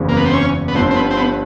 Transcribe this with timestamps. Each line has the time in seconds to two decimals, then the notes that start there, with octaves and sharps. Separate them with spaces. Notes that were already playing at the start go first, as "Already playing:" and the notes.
Already playing: F#1 E2 C#3 E3 G#3
0.09 A#3
0.17 B3
0.25 C4
0.33 C#4
0.68 B3
0.75 G1 G2 D3 F3 C4
0.90 C4
0.95 B3
1.11 C4
1.17 B3